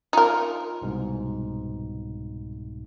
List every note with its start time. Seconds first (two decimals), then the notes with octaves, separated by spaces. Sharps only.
0.13 D#4 F4 A#4
0.82 C2 G#2 B2